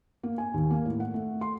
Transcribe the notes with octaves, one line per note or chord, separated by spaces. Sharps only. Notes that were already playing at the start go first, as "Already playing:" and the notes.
A#3
G#5
D#2
A#3
A2
F#5
A3
C6